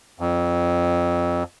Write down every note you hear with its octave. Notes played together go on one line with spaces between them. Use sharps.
F2